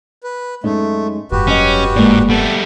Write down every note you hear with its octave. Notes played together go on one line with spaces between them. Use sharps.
B4
F#2 G#3 A3 D#4
F1 G2 F#4 G4 B4
F#3 C#4 C#5 D#5
G#2 G#3 A#3 D5
G3 A3 B3 A4